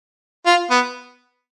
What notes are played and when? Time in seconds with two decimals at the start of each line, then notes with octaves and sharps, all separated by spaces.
0.46 F4
0.71 B3